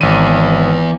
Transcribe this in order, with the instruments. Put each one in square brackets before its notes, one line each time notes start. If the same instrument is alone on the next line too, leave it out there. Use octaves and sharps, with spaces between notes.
[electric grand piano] G#1 D#7 [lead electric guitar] E2